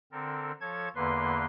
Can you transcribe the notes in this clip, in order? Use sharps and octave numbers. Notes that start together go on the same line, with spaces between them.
D3 C4 A4 A#4
F3 A4 C#5 A5 G#6
E2 D3 A#3 B4 C6